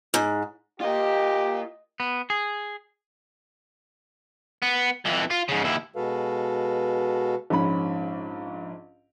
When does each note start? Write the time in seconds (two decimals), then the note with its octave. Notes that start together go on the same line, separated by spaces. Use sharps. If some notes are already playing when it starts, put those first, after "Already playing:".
0.14 G#2
0.80 F4 G4 A#4 D#5
2.00 B3
2.30 G#4
4.62 B3
5.05 F2 E3
5.31 F4
5.49 G#2 C#3
5.64 D#2 E4
5.96 B2 G#3 F#4 A4 B4 F5
7.50 A#1 G#2 C#4 B5